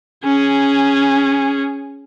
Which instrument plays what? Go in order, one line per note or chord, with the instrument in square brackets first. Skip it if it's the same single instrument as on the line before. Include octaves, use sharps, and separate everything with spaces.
[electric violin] C#4 G#4